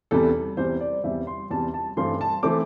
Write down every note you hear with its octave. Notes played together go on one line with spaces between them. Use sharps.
E2 C3 G3 A4
E2 C3 G3 C5
D5
E2 C3 G3 E5
C6
E2 C3 G3 A5
A5
G2 E3 A3 C4 C6
A5
E3 A3 C4 D6